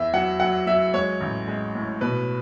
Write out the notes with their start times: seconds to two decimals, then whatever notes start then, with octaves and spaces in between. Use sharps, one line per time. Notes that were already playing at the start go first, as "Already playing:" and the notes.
Already playing: E2 E5
0.13 F#3 F#5
0.40 F#3 F#5
0.67 F#3 E5
0.94 G#3 C#5
1.21 A1
1.48 G#3
1.75 A2
2.01 B2 B4